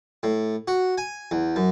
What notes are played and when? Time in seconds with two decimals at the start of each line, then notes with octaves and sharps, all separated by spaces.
0.23 A2
0.68 F#4
0.98 G#5
1.31 E2
1.56 F#2